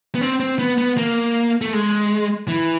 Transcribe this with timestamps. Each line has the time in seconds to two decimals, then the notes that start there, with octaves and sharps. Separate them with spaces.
0.15 B3
0.21 C4
0.40 C4
0.59 B3
0.78 B3
0.97 A#3
1.61 A3
1.73 G#3
2.48 E3